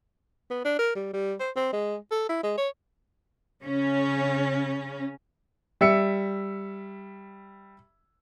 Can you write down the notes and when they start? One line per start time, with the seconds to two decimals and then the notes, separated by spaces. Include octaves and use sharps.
0.51 B3
0.65 D4
0.79 A#4
0.96 G3
1.13 G3
1.40 C5
1.56 C4
1.73 G#3
2.11 A4
2.29 E4
2.43 G#3
2.58 C#5
3.63 C#3 C#4
5.81 G3 E5 E6 C#7